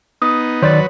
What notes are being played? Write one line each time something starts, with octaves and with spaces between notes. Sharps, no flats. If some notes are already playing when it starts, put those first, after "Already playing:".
B3 D#4 D#6
D#3 F#3 B4 C#5 D5 C6 A6